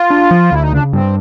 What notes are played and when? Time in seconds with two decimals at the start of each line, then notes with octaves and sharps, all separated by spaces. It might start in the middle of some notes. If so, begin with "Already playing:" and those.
Already playing: F4
0.10 D4
0.31 F3
0.52 D2 E4
0.62 D#4
0.73 C#3 D4
0.93 G2 C4